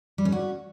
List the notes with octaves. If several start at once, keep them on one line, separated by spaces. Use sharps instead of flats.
G3
C#4
F#4